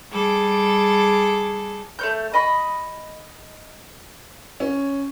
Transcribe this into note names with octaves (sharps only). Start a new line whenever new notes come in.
G3 G#4 A4 D6
A3 C#5 G6
D#5 B5 C#6
C#4